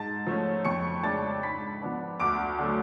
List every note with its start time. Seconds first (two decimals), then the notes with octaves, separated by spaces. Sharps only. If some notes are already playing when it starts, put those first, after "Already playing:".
Already playing: G#2 A5 A6
0.26 F3 A3 C#4
0.65 F2 C#6 C#7
1.03 C#3 G#3 D4 A5 A6
1.42 G#2 B5 B6
1.82 F3 B3 D4
2.20 D2 D6 D7
2.59 D3 F#3 A3